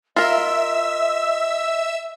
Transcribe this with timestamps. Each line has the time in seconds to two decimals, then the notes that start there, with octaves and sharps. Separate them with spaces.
0.16 F4 A#4 D#5 E5 E6